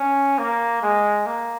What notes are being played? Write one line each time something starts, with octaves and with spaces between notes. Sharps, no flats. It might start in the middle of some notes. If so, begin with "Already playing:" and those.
Already playing: C#4
A#3
G#3
A#3